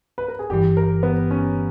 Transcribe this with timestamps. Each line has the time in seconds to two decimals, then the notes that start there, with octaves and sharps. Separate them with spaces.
0.18 B4
0.28 A#4
0.39 G#4
0.50 G1 G2 E3 G4
0.77 A#4
1.03 B3
1.31 C#4